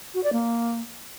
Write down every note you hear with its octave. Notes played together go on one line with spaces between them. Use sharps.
F#4
D5
A#3